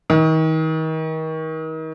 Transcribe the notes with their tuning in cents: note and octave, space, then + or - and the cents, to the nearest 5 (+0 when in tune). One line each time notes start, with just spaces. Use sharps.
D#3 +35